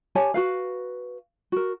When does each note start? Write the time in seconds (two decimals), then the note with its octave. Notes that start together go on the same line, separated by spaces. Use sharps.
0.15 G4 C#5 G#5 A5
0.34 F#4 B4 F5
1.52 F#4 A#4